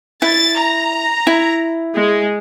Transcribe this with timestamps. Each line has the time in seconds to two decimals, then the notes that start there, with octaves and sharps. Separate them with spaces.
0.22 E4 A6
0.60 A#5
1.27 E4
1.95 G#3